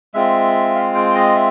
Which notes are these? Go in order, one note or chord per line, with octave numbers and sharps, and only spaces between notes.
G#3 C4 F4 E5
F5
G5
D#5
E5